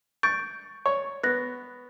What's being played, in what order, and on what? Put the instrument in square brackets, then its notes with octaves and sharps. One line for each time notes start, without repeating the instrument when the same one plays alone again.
[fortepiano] C#6 [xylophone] G6 A6 D7
[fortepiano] C#5 [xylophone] C#6
[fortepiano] B3 [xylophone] F#6 A#6